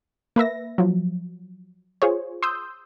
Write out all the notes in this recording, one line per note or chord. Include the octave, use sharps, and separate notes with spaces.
A#3 B4 E5 A#6
F3 F#3
F4 G#4 C5 C#5
C6 D#6 E6 G6